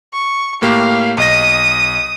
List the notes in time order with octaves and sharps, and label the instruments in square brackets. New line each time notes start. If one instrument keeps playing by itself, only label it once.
[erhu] C#6
[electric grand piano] A2 A#3 G4 [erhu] F5
[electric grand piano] B1 D#5 A#6 [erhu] D#6